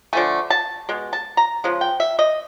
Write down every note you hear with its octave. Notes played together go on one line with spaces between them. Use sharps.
D3 F3 A3 G#5
A5
B2 G#3
A5
A#5
C#3 F3 G#3
G5
E5
D#5